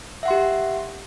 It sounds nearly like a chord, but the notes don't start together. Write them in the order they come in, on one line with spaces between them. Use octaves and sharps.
E5 F#5 C6 G4